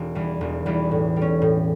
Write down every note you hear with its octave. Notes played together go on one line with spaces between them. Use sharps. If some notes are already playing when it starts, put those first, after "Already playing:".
Already playing: E1
E2 E3 G3
E1
E2 E3 G3
A2
G3
C#4
A2